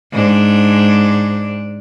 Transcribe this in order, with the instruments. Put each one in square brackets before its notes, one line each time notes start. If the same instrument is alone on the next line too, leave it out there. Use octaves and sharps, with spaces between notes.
[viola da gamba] G#2 D4